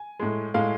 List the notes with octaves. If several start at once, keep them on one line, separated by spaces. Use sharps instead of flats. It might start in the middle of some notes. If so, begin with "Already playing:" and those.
Already playing: G#5
A2 G#3
A2 G#3 F5